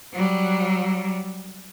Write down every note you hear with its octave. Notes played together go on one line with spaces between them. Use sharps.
F#3 G3